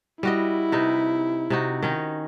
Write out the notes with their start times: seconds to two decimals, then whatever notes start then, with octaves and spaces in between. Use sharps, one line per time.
0.23 G3 E4 F#4 D#5
0.72 C3 D#4 B4
1.50 C3 D#4 F#4
1.82 D#3 C#4 D#4